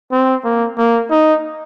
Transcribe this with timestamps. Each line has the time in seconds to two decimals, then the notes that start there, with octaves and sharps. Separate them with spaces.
0.12 C4
0.44 A#3
0.78 A#3
1.11 D#4